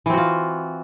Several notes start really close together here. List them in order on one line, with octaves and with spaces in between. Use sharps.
E3 C4 F#4 F4